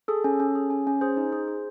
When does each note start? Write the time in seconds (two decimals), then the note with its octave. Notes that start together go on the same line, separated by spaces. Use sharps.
0.08 G#4 A4
0.24 C#4
0.40 C#4
0.55 G#4
0.70 C#4
0.87 C#4
1.01 G#4 C5
1.17 D#4
1.33 G#4
1.48 G#4